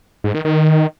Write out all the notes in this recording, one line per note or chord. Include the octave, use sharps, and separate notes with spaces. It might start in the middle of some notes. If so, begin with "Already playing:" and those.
G#2
D#3
D#3